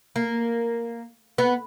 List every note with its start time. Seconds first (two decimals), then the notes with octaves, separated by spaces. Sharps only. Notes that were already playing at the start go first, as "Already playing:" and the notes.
0.16 A#3
1.38 B3